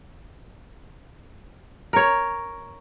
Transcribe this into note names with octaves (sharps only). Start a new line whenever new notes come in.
A#4 C#5